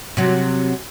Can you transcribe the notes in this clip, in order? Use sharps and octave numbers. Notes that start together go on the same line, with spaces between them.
C3 F#3